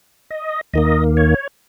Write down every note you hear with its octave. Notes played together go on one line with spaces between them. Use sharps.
D#5
D#2 D#3 A#3 D#5
C#5